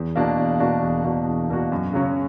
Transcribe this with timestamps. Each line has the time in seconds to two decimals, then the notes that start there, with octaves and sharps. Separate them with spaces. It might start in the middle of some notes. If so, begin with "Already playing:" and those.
Already playing: E2
0.16 B2 A#3 D4 F#4
0.38 E2
0.60 B2 A#3 D4 F#4
0.82 E2
1.04 B2 A#3 D4 F#4
1.27 E2
1.49 B2 A#3 D4 F#4
1.72 F#2
1.93 C#3 F#3 C#4